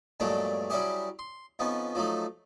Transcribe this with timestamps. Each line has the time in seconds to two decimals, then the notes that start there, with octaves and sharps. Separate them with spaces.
0.20 G2 A#2 F#3 G#3 A3 D4
0.70 F#3 G3 C#4 E4 G4 G#4
1.19 C6
1.59 F2 F3 B3 C#4 D#4
1.95 F3 F#3 A3 D#4